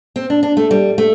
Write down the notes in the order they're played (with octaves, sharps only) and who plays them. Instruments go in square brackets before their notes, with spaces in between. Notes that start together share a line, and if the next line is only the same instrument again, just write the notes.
[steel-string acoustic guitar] C4
D4
D4
A3
G3
A3